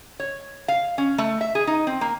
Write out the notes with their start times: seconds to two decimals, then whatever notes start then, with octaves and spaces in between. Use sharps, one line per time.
0.20 C#5
0.68 F5
0.98 C#4
1.18 A3
1.41 E5
1.55 G#4
1.67 D#4
1.87 C4
2.01 A#3